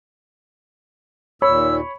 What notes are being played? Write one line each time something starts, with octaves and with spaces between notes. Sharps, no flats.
D#2 A#2 C#5 B5 E6